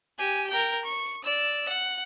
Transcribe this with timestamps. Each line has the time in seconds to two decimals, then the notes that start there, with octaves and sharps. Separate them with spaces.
0.19 G4 G#5
0.50 A#4 G5
0.85 C#6
1.24 D5 E6
1.69 F#5